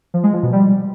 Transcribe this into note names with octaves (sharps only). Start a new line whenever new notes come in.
F3
G#3
F3
B2
G3